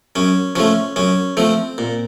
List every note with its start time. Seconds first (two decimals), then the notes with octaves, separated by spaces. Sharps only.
0.16 F#2 C#4
0.56 F3 A3 C#4
0.96 F#2 C#4
1.37 F3 A3 C4
1.78 A#2